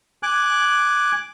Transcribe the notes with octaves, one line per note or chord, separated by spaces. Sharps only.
G#5 D6 F#6